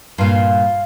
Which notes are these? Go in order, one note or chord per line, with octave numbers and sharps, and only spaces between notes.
G2 A#2 F4 F5